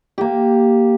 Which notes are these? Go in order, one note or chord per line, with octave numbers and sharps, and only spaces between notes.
A#3 G4